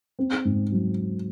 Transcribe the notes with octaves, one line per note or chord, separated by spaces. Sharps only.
C4
G#2
F#3